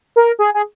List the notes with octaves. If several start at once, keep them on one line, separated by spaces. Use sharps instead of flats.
A#4
G#4
G#4